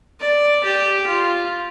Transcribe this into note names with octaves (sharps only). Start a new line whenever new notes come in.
D5
G4
F4